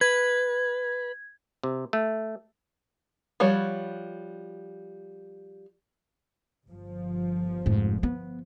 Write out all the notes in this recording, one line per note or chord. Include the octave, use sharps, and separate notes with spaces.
B4 G#6
C3
A3
F3 G3 F#4 C#5
G1 F3
F1 G#2
B3